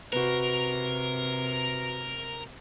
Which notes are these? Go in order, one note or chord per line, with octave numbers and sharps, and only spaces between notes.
C3 F#4 A#4 B4